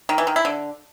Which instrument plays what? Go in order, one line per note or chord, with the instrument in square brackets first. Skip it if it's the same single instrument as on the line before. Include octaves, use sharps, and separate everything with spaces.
[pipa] D#3
E3
D#3
E4
D3